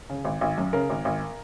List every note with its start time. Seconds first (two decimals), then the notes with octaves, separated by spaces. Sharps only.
0.10 C#3
0.25 G#1
0.41 G#1
0.58 F#2
0.73 C#3 A#4
0.90 G#1
1.05 G#1